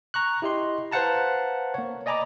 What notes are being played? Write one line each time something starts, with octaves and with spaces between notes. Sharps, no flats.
A#5 C#6 F#6
E4 G4 D#5 C6
B4 C5 F5 F#5 A5 A#5
A#3 C#5
D5 D#5 G#5 A#5 B5 D6